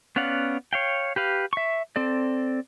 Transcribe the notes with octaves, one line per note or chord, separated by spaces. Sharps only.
B3 C#4 D5 F5 F#5
C#5 F5 G5
G4 B4 F5
E5 C#6
C4 A4 D5